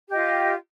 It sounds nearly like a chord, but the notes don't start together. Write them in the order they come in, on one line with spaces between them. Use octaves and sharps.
G4 D#5 F4